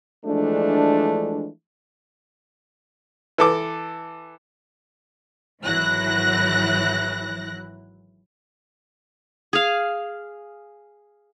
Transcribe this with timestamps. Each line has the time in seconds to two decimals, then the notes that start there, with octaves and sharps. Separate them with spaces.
0.25 E3 F3 G#3 A3 D4
3.38 E3 A4 D6
5.63 G#1 E3 F#3 E4 F#6 A#6
9.53 G#4 F5